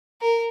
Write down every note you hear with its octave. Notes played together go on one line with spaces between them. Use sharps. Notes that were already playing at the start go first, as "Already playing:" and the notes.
A#4